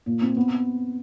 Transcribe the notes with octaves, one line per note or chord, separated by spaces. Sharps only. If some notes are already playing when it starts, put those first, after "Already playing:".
A#2
C4
B3